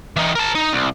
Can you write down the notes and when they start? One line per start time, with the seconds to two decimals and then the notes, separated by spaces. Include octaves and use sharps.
0.16 E3 D#4
0.35 A#4 A5
0.55 D#4
0.73 C2